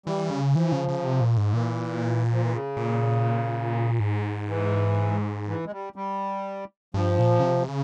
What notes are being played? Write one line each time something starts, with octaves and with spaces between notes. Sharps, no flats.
E3 G3
C#3
E3 F3
C#3
C#3
C3
A#2
G#2
A#2 E3
F3
E3
C#3
A#2
G#2
E3
E3
G#3
G3
G3
G2 F3
A#2
C#3
C3
C#3